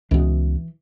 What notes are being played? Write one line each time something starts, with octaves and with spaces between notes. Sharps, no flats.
C#2 B2 E3